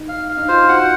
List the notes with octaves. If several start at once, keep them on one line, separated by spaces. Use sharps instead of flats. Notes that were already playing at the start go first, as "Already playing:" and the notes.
Already playing: D#4
F5
F5
D#4
F4 C5
F#4 F#5